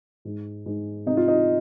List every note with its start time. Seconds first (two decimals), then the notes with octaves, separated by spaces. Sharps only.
0.25 G#2
0.66 G#2
1.06 C3 D#4
1.17 F4
1.28 D#4